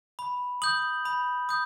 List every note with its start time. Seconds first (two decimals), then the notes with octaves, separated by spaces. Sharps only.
0.19 B5
0.62 D#6 G6 F#7
1.05 B5
1.49 D#6 G6